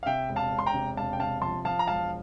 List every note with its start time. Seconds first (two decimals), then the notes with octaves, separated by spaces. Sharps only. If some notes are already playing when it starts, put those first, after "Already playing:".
0.03 F5
0.06 C3 E5 G5
0.29 E1
0.36 F5 A5
0.51 E1
0.59 C6
0.66 G5 A#5
0.74 C3
0.96 E1 F5 A5
1.13 G5
1.19 C3 F5 A5
1.42 F3 A5 C6
1.65 F3 F5 A5
1.79 A#5
1.87 E1 F5 A5